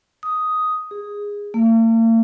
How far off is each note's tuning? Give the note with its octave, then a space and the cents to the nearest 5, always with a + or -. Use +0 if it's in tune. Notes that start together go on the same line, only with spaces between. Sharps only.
D#6 +5
G#4 -15
A#3 -45